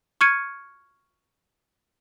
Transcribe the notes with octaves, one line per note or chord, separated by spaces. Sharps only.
C#6 F6 G#6 C#7 D#7